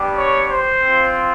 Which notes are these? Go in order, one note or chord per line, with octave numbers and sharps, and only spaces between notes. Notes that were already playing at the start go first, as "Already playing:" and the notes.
Already playing: G3 B3 D4 G4
C#5
C5
C4 F4